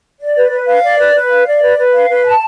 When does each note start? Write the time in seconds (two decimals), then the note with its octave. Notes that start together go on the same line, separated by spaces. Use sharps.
0.20 D5
0.36 B4
0.51 B4
0.67 F5
0.82 D5
0.98 B4
1.14 B4
1.30 F5
1.46 D5
1.61 B4
1.78 B4
1.93 F5
2.09 B4
2.25 A5